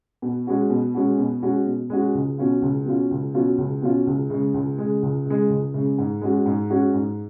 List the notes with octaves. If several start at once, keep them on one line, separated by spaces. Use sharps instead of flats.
B2
G#3 C#4 F#4
B2
G#3 C#4 F#4
B2
G#3 C#4 F#4
B2
G#3 C#4 F#4
C#2
B2 F#3 C#4 F4
C#2
B2 F#3 C#4 F4
C#2
B2 F#3 C#4 F4
C#2
B2 F#3 C#4 F4
C#2
C#3 G#3
C#2
C#3 G#3
C#2
C#3 G#3
C#2
C#3 G#3
G#2
G#3 C#4 F#4
G#2
G#3 C#4 F#4
G#2